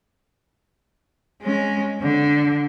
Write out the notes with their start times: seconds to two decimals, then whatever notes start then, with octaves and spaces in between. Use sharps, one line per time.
1.42 G#3 C#4
2.02 D3